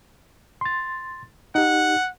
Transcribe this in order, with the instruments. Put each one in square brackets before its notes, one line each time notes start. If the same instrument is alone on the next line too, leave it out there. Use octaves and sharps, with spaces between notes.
[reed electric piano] C6 A6
[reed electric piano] D#4 G4 [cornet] F#5